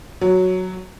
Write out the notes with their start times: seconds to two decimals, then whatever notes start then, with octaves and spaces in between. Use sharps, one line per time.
0.21 F#3